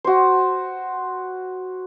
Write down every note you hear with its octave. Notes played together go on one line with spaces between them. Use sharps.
F#4 C5